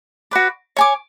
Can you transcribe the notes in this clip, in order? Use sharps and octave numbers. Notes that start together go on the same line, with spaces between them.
F#4 B4 D5
C#5 G#5 D6